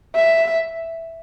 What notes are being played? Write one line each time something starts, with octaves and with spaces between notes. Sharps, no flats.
E5